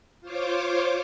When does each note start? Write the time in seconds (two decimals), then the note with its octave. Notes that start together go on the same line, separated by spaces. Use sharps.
0.21 F4 C5 C#5 D6